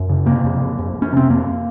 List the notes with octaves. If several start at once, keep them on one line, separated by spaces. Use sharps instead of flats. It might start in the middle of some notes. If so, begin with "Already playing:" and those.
Already playing: F#2
C#3
C3 A#3
F2
F2
F2
F2
C#4
C3 C4
F2 A#3